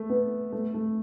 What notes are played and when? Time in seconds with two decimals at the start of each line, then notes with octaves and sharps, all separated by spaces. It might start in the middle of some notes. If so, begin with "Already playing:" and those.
Already playing: A3
0.10 B3
0.52 A3
0.74 A3